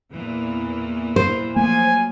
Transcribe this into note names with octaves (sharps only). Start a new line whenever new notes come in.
E2 A#2 E3
C5
F3 F#3 A3 A#3 G#5